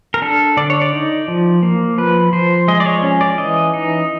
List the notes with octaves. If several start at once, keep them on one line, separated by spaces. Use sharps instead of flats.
A#4
D4 A4
D3 D5
C#5
D5
D#4
F3
A#3
F3 B4
F3 C5
G#3 D#5
D5
C#5
C#4
D5
E3 D#5
D#4